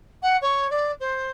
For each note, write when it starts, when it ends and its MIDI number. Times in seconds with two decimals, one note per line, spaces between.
0.22 0.37 78
0.41 0.70 73
0.70 0.91 74
1.00 1.30 72